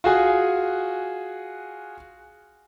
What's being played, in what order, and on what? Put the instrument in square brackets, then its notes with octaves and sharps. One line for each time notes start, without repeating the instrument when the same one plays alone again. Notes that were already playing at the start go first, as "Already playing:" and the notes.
[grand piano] F4 F#4 G#4 G#5